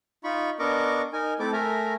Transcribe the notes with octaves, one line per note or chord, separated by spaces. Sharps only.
D#4 F4 B5 C#6
B3 D4 A#4 D#5 C#6 D6
D#4 A#4 G#5
A3 C4 E4 A4 D6
A3 A#4 E5 G#5 A#5